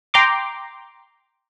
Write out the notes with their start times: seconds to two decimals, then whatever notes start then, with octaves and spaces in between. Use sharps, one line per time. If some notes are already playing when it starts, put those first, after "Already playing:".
0.14 G5 A#5 C6 D6